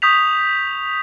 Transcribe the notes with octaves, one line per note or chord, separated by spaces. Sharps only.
C#6 D#6 G6 B6 F7